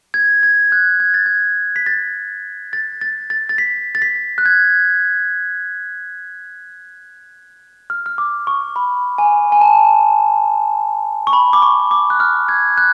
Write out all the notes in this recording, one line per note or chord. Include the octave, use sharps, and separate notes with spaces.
G#6
G#6
F#6
G#6
A6
G#6
B6
A6
A6
A6
A6
A6
B6
A6
B6
F#6
G#6
F6
F6
D6
C#6
B5
G#5
G#5
A5
C#6
B5
D6
C#6
D6
F#6
F6
G#6
F#6